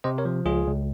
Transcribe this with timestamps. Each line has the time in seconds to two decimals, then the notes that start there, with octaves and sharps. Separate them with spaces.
0.04 C3 C5 D#5
0.18 A#4 C#5
0.25 F3
0.46 C#2 F4 G#4
0.67 C#2